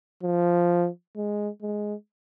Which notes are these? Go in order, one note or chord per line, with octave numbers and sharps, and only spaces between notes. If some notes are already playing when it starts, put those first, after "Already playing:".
F3
G#3
G#3